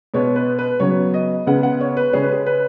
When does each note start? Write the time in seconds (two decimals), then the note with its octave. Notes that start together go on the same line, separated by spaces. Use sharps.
0.14 B2 G#3 B3 C#5
0.36 B4
0.59 B4
0.80 C#3 F#3 B3 C#5
1.14 D#5
1.46 C#3 G#3 B3 F#5
1.63 F#5
1.81 C#5
1.97 B4
2.13 C#3 G#3 C#4 G#4
2.23 B4
2.32 G#4
2.46 B4